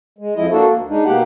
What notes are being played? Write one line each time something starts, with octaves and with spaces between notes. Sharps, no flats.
G#3
F2 F3 E4 D#5
A#3 D4 F#4 A4
D2
G#3 D4 D#4
B2 A#3 G4 F#5